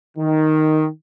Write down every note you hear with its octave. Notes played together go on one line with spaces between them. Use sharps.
D#3